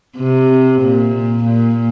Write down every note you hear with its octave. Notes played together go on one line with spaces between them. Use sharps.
C3
A#2
A#2